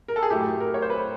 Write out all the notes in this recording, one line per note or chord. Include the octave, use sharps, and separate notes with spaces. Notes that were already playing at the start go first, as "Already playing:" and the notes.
A#4
A4
G#4
A2 F#3 A3 G4
A#4
C#5
C5
B4